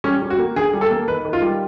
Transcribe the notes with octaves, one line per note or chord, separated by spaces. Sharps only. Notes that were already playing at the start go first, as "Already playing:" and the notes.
G3 C#4
G3
F#4
A#3
D3 G#4
G3
A4
A#3
D#3 B4
D#3
F4
G3